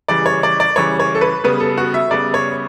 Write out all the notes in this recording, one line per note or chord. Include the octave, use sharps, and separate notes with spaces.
C#3 E3 G3 D5
C#5
D5
D5
C#3 E3 G3 C#5
C#5
A4
B4
C#3 G3 B3 B4
A4
F#4
E5
C#3 G3 B3 D5
C#5